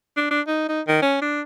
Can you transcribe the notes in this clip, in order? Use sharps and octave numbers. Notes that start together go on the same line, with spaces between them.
D4
D4
D#4
D#4
D#3
C#4
D4